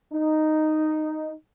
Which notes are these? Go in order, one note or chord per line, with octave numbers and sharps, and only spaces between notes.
D#4